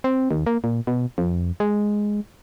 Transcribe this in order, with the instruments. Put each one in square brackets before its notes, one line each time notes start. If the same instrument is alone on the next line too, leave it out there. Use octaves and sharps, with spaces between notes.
[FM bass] C4
D#2
A#3
A#2
B2
F2
G#3